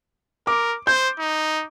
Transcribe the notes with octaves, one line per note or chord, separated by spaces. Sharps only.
A#4 D6
C5 G6
D#4